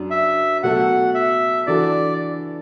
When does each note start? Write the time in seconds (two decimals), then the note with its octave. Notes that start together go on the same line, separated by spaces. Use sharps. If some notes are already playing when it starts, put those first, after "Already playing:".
Already playing: F#2 F#3 D4
0.10 E5
0.63 B2 F#3 A3 F#4 A4 F#5
1.14 E5
1.67 E3 D4 F#4 A4 D5